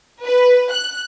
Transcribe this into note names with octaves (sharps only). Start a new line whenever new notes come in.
B4
F#6